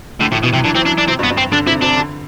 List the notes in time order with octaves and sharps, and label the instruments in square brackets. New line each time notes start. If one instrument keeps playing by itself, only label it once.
[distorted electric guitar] A2 [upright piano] D3
[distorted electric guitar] A2 [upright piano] E3
[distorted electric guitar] B2 [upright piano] E3
[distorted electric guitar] C3 [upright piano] F#3
[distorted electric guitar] D3 [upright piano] E3
[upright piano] E3 [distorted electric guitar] C4
[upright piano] F#3 [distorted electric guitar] D4
[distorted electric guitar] D4
[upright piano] C3 [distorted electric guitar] C4
[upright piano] G2
[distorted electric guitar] B3
[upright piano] G2
[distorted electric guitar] C4
[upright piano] D3 [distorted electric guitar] D4
[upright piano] C3 [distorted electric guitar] E4
[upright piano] C3 [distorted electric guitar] D4
[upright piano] D3